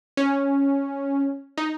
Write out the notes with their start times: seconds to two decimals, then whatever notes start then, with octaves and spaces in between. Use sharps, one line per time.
0.17 C#4
1.58 D#4